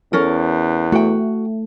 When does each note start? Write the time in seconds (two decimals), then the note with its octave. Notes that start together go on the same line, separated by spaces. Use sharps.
0.13 E2 C#4 A4 A#4
0.92 A3 F#4 G5